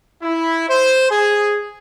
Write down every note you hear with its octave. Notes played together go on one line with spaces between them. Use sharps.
E4
C5
G#4